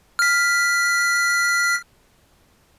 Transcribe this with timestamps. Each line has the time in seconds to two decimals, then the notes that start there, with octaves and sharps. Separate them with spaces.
0.19 F6 B6